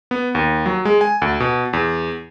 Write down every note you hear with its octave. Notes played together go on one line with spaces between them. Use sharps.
B3
D#2
F#3
G#3
G#5
D2
B2
E2